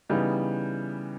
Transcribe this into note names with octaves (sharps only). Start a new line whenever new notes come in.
C#3 E3 G3 B3 D#4